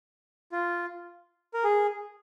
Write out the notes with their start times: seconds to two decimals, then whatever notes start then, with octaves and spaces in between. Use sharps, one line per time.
0.52 F4
1.54 A#4
1.64 G#4